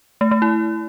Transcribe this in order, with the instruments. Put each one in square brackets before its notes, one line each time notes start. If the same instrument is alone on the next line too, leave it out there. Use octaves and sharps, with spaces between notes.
[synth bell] A3
A3
E4